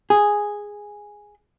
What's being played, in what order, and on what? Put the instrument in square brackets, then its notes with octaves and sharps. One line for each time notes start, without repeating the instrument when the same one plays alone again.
[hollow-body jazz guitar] G#4